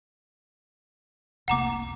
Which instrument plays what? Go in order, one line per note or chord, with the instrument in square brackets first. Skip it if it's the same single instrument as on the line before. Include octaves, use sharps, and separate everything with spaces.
[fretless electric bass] F1 C2 A#3 [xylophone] F#5 A#5 D6